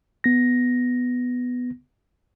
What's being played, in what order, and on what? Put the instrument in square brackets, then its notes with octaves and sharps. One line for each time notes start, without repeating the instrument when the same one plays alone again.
[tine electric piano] B3 A#6